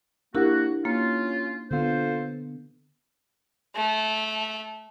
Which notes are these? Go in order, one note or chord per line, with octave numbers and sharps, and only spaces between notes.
A#3 D4 E4 F#4 G4 A#4 F#5
A#3 C#4 F4
D3 B3 F4 A4 C5
A3